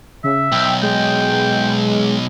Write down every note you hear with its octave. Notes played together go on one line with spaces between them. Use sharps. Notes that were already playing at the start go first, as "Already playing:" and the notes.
C#3 E5
B1 G5
G#3 G5